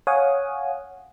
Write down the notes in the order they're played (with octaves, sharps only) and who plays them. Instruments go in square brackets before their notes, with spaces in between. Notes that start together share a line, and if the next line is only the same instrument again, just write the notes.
[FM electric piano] C#5 F5 F#5 G#5 D#6